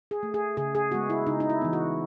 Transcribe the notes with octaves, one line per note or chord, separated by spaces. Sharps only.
G#4
A3
G#4
C#3 G#4
G#4
G#3 B3 F#4
E4
C#3 D#4
D#4
E4
E3 B3
F#4